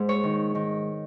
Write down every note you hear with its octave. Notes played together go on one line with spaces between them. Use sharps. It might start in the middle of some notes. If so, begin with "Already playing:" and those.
Already playing: G#2
C#5
D#3
D#3